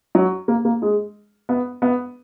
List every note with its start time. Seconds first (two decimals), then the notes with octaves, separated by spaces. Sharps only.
0.15 F#3
0.48 A#3
0.65 A#3
0.82 G#3
1.49 B3
1.82 B3